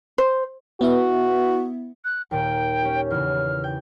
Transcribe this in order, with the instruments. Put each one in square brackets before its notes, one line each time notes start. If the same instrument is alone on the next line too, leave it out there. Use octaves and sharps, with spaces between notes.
[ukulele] C5
[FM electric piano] B3 E4 E5 [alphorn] F#4
[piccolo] F#6
[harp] D#2 A#2 [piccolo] G5
[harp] C#4 G4
[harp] E2 C#3 [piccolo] F6
[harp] G5